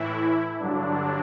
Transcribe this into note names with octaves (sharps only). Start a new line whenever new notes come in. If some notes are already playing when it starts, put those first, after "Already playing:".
Already playing: A2 E3 E4
G2 D3 F#3 D4